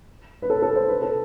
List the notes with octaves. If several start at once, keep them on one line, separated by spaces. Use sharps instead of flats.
B4
A4
A4
C5
B4
A4